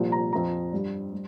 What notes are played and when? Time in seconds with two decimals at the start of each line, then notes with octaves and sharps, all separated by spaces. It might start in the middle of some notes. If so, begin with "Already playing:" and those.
Already playing: C2 A#2 F3
0.12 A#5
0.32 F2 F3 A#5
0.73 G2 G3
1.12 G3